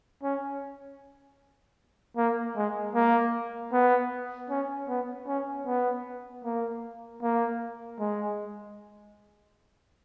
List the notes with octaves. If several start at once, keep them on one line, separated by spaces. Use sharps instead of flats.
C#4
A#3
G#3
A#3
B3
C#4
B3
C#4
B3
A#3
A#3
G#3